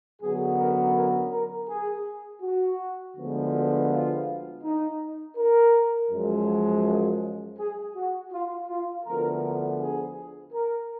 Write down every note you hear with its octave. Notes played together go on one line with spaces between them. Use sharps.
F#2 D3 F#3 B3 G#4
A#4
A#4
A#4
G#4
F#4
D2 D3 F3 G#3 B3
F4
D#4
A#4
F#2 F3 G#3
G#4
F#4
F4
F4
D2 D3 F3 B3 A#4
G#4
A#4